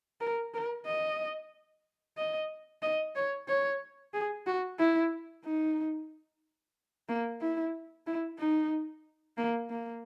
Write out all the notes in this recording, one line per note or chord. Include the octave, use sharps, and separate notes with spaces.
A#4
A#4
D#5
D#5
D#5
C#5
C#5
G#4
F#4
E4
D#4
A#3
E4
E4
D#4
A#3
A#3